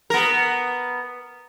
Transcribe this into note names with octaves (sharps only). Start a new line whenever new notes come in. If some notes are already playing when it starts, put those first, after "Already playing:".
B3 A#4